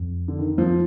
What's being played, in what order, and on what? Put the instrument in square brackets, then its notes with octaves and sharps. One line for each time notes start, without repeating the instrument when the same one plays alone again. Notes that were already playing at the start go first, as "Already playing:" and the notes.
Already playing: [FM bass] F2
[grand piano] D3
D#3
F3